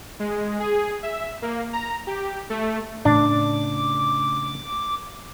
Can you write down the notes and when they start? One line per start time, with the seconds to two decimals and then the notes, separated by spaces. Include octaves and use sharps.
0.20 G#3
0.60 G#4
1.03 E5
1.42 A#3
1.73 A#5
2.07 G4
2.50 A3
3.05 A2 C#3 D4 D6